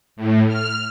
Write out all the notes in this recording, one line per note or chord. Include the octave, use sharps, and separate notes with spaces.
A2
F6